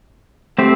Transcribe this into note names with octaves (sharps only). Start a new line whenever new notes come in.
A3 C4 G4 C5